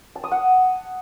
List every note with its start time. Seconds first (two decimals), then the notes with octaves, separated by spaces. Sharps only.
0.15 A5
0.23 D#6
0.31 F#5